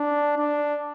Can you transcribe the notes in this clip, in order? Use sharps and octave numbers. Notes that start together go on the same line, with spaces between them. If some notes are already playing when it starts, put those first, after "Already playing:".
Already playing: D4
D4